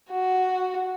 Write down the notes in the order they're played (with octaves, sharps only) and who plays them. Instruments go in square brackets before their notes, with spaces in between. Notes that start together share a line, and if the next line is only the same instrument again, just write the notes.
[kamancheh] F#4